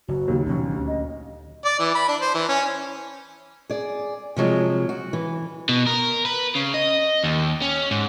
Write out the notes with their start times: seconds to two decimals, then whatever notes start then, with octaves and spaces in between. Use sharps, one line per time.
0.08 F#1 F#4
0.28 D#2 C#3 F#3
0.46 A#1 B2 F#3 C#4
0.70 D2
0.88 D#5
1.65 D5
1.79 E3
1.95 B5
2.08 D4
2.21 C5
2.34 E3
2.49 C#4
3.70 G#4 D5
4.36 C3 F3 F#3 G#3
4.89 F#4
5.13 E3
5.69 B2
5.87 A#4
6.25 B4
6.55 C#3
6.74 D#5
7.24 D#2
7.62 C#4
7.91 G#2